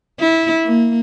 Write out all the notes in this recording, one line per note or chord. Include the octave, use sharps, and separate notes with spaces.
E4
A#3